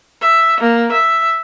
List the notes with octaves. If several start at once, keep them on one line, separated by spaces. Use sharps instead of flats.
E5
A#3
E5